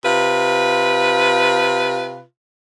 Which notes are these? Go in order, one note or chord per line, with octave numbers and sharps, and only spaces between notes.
C3 F4 B4